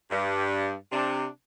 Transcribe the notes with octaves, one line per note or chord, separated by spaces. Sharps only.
G2
C3 D4